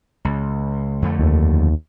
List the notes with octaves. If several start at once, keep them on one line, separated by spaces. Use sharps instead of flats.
C#2
F2 D3 A3
D#2